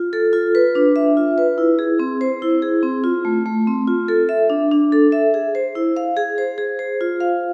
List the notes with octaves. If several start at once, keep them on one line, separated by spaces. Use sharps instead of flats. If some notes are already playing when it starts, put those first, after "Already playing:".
Already playing: F4
A4
F4
B4
D4
E5
F4
B4
E4
G#4
C4
C5
E4
G#4
C4
F4
A3
A3
C4
F4
A4
E5
D4
D4
A4
E5
G#4
C5
E4
F5
G#4
C5
G#4
C5
F4
F5